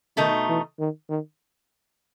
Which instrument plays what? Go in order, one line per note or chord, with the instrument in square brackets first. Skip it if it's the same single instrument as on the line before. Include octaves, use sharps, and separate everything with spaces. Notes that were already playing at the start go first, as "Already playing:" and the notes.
[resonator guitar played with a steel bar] B2 A3 D#4 [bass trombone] D#3
[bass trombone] E3
D#3
D#3